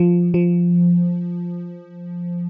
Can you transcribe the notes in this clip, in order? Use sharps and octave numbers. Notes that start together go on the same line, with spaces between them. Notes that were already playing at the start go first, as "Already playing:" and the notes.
Already playing: F3
F3